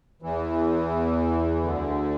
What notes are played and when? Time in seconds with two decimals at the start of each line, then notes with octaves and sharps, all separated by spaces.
0.22 E2 E3
1.63 D2 D3